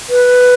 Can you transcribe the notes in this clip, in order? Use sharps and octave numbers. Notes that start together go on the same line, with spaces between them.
B4